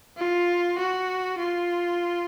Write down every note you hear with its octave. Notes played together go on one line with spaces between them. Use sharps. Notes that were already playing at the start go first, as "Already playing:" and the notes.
F4
F#4
F4